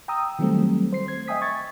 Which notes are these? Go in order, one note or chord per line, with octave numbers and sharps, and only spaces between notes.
G5 A#5 D#6 E6
D#3 F#3 G3 A3 C4 A4
C5 C7
G#6
D#5 E5 G5 G#5 D#6 B6
C#6 G#6 A6